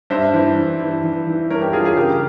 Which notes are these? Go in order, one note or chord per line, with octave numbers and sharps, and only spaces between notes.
G2 C5 E5
E3
G2
E3
E3
E3
G2 A#4 C#5
G4 A#4
G2 F4 G#4
F4 G#4
C#3 G4 A#4